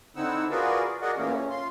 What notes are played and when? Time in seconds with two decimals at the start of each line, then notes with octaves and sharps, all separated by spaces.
0.16 D3 C4 D#4 E4 F#5 E6
0.51 F4 F#4 G#4 A#4 B4 D5
1.02 F#4 G#4 A#4 D5 D#5 F#5
1.17 E2 A#2 E3 A3 A#3 C#4
1.34 C#4
1.50 F4 C6